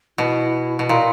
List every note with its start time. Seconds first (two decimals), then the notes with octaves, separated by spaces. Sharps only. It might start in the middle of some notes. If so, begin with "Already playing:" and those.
0.18 B2 E4
0.79 B2
0.89 A#2